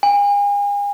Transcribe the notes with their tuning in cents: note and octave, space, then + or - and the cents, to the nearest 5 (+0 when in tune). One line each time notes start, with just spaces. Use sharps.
G#5 -40